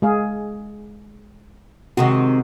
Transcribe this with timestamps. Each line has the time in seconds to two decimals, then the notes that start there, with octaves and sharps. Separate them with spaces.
0.02 G#3 G#4 F5
1.97 C3 D#3 G#3 F#4